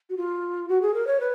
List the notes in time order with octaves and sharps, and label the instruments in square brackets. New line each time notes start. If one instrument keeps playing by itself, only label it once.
[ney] F#4
F4
F#4
G#4
A#4
C#5
B4